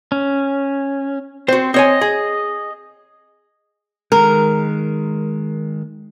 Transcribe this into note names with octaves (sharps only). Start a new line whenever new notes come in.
C#4
C4 F#4 C5
C4 C#5 D#5 G#5
G#4
D#3 G#3 A#4